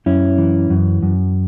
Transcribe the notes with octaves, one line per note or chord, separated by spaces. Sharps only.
F#2 C#4 E4
E3
F#2
F#2